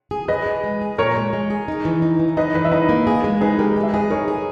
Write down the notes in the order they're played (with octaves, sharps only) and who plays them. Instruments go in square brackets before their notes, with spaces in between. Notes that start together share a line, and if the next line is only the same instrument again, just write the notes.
[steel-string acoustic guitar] G#4
[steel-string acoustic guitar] G#4 [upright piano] B4 D#5
[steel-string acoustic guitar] G#4
G#3
G#4
[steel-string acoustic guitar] A#2 [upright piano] A#4 C#5
[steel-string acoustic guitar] G#3
G#3
G#4
D#4
E3
D#4
E3
[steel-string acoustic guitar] D#4 [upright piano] B4 D#5
[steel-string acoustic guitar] E3 [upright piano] B4 D#5
[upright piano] E5
[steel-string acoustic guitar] D#4 [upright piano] B4 D#5
[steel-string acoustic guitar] A#3
G#4
G#3
[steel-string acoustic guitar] D#4 [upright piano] G#4 B4
[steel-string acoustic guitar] G#3 [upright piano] G4 A#4
[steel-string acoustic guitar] G#3
[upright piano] E5
[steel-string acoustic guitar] G#4 [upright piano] B4 D#5
[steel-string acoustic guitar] D#4 [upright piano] A#4 C#5
[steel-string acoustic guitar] G#4